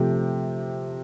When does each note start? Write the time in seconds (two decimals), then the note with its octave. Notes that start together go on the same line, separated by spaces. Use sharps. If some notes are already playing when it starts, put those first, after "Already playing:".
Already playing: C3 F3 A3 G5